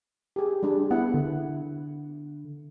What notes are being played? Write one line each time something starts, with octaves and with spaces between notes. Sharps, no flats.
G4 G#4
G3 D4 G#4
B3 E4 F#5
D3